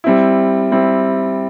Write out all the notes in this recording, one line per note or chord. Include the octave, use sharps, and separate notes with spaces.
G3 C4 E4
G3 C4 E4